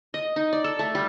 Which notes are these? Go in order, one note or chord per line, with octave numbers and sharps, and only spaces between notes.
D#5
D#4
D5
A4
A3
G3